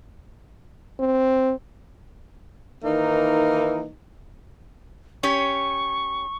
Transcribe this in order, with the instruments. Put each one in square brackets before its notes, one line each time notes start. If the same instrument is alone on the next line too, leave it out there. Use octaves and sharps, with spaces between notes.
[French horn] C4
[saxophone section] D#3 E3 A#3 D#4
[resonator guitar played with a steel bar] C#4 G4 C#5 [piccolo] C#6